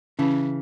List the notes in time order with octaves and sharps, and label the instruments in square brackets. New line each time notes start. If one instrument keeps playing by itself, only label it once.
[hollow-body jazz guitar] C#3 E3 [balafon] C#4